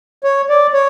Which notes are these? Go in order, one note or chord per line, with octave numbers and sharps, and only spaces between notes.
C#5
D5
C#5